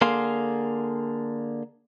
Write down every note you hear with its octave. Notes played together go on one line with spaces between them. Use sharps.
D3 A#3 G#4 F5 C6